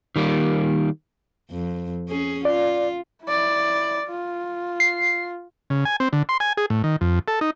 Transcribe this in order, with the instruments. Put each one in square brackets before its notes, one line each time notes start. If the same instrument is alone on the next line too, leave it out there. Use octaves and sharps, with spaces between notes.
[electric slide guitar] D#3 G3 A#3
[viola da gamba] F2
C#4 G#4
[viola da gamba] F4 [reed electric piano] D5
[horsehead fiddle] E4 D5
F4
[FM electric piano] C7
[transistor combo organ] C#3
G#5
C4
D3
C6
G#5
G#4
A2
D#3
F2
A4
D#4